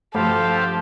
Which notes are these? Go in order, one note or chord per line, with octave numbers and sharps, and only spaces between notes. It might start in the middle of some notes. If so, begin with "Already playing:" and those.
G2 F3 A3 F#4 G4 A4 C5 F5